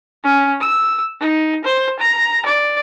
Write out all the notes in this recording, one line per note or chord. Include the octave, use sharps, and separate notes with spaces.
C#4
E6
D#4
C5
A#5
D5